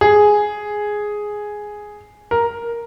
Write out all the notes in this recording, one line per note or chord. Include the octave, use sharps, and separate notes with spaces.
G#4
A#4